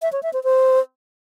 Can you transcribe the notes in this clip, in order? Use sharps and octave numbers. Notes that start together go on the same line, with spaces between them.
E5
C#5
E5
C5
C5